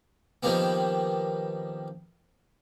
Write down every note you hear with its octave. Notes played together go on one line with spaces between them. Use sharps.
D#3 F3 G3 A#3 B3